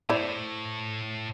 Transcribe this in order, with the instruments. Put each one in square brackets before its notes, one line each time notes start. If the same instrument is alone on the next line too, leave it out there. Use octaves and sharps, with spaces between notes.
[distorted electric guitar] A2 [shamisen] E4 C5 D5